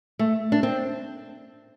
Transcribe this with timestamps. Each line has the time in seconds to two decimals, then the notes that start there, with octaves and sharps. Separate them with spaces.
0.19 A3
0.52 D4
0.63 C4